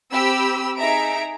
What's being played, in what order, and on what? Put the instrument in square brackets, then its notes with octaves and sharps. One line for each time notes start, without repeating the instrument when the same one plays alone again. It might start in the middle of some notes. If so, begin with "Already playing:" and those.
[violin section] C4 G4 B5 E6
D#4 G#4 E5 A#5 D7